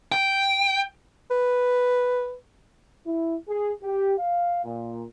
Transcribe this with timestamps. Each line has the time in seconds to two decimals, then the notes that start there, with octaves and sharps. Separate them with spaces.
0.12 G5
1.31 B4
3.06 E4
3.48 G#4
3.83 G4
4.19 F5
4.64 A#2